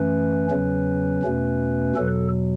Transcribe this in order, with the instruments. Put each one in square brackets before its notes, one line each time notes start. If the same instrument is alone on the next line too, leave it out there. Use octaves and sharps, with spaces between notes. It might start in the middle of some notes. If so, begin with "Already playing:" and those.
Already playing: [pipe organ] F#2 E3 A3 C#4 B4
E2 C#3 F#3 C#4
E2 B2 A3 C#4
E2 B2 F#3 A4